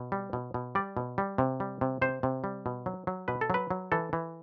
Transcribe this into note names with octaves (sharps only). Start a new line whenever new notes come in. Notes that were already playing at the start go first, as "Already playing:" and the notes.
Already playing: B2
G3
B2
B2
G3 D5
B2
G3
C3
G3
C3
C3 C5
C3
G3
B2
F#3
F#3
B2 B4
A4
F#3 B4
F#3
E3 A4
E3